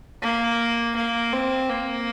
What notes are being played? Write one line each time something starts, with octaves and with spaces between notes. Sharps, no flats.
A#3
A#3
C4
A#3